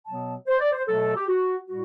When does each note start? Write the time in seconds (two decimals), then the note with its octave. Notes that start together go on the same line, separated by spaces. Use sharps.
0.07 B2 F#3 B3 A5
0.48 C5
0.60 D5
0.73 C5
0.88 B2 F#3 A3 A4
1.16 G4
1.28 F#4
1.69 A2 G3 F#4